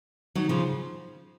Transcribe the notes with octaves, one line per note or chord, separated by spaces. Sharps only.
D#3 F#3
C#3 F3